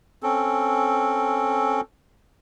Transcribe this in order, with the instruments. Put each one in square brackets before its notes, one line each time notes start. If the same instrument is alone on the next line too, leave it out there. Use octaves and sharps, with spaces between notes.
[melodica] C4 C#4 A4